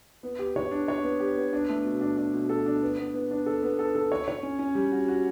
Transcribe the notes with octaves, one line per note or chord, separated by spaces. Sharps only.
B3
G4
C#5
D4
C#5
B3
G4
B3
D4
A3
B2
D4
D4
B2
A4
D4
B3
B3
B3
D4
A4
B3
A4
A4
C#5
C#5
C#4
C#4
G3
F#4
F#4